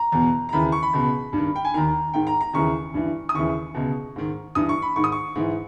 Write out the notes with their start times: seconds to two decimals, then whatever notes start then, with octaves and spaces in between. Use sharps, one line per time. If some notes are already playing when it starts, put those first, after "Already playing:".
Already playing: A#5
0.12 E2 B2
0.49 A#5
0.53 D#2 C#3 E3 B5
0.72 C#6
0.83 B5
0.93 C#2 B2
1.33 G2 D#3
1.56 G5
1.65 G#5
1.74 D#2 D#3 A#5
2.14 G#2 D#3 G5
2.27 A#5
2.41 A#5
2.54 D#2 C#3 E3 C#6
2.94 G2 E3
3.29 D#6
3.35 D#2 C#3 E3 C#6
3.74 C#2 B2
4.16 G#2 D#3
4.55 G2 E3 D#6
4.69 C#6
4.82 B5
4.96 G#2 D#3 C#6
5.04 D#6
5.12 C#6
5.35 G#2 E3